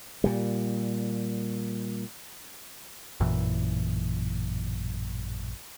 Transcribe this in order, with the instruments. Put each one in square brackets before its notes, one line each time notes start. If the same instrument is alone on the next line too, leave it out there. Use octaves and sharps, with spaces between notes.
[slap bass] A#2 G3
[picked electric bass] A1 F#2 A#2 E3